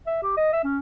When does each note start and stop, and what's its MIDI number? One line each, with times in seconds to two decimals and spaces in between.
0.07 0.19 76
0.23 0.36 67
0.37 0.51 75
0.53 0.60 76
0.64 0.79 61